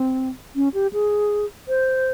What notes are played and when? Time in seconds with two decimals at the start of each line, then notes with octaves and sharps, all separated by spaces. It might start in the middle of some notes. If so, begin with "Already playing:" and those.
Already playing: C4
0.56 C#4
0.74 G4
0.93 G#4
1.68 C5